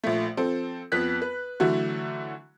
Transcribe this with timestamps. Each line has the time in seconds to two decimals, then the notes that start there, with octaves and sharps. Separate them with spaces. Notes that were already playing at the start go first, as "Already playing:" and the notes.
0.04 A#1 F3 A3
0.37 F3 C4 A4
0.92 F2 B3 F#6 B6
1.22 B4
1.60 D3 E3 F#3 A3 F#4